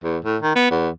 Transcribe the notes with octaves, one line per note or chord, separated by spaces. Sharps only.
E2
A2
D#3
B3
E2